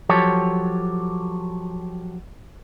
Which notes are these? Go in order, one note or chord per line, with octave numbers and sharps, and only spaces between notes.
F3 F#3 G4 A4 C#5